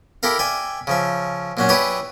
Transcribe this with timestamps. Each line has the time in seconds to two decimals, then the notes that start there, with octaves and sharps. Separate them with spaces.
0.23 E4 G4 A4 A#4 F5
0.39 D5 E5 G5 G#5
0.87 C#3 F3 E5
1.57 A#2 F#3 C#4
1.69 E4 G4 G#4 B4 C#5 D5